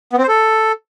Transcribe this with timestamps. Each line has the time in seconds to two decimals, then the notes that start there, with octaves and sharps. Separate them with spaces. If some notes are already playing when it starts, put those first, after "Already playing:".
0.13 B3
0.18 C4
0.23 C5
0.28 A4